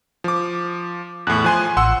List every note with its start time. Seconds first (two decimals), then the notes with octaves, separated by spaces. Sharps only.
0.24 F3 D6
1.27 E2 A2 F#6
1.44 F3 G#5 C6
1.77 A1 F#5 C6 E6